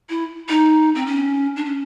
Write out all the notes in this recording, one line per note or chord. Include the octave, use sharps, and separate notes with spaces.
E4
D#4
C4
C#4
D4
C#4